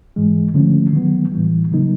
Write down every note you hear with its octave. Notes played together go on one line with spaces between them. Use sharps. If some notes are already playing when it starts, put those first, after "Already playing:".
G#2 E3 G#3
D3 F3 A3 C#4
D#3 F#3 B3
A2 E3 G3
C#3 F#3 A#3 D#4